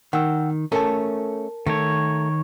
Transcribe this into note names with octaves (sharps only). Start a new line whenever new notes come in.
D#3 F#5 G5 E6
A3 C#4 A4 A#4 A5
D#3 A3 C#5